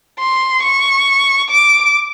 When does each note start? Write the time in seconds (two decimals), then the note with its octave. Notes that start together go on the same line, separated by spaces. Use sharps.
0.20 C6
0.63 C#6
1.50 D6